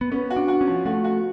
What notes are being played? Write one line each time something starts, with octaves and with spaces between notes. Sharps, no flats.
B3
B3 C#4
F#4
D4
F#4
C#4
F3
A3 F#4
F#4